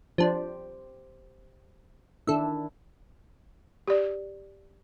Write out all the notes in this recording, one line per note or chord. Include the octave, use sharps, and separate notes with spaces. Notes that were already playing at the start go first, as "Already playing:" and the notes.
F3 D4 G4 C5
D#3 D4 E4 A4 E5
G4 D5